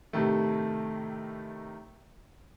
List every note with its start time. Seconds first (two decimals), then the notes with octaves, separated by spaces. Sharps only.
0.13 A2 C3 D#3 A3